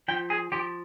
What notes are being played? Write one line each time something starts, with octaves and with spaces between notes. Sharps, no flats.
F3 G5
G#4
F3 G4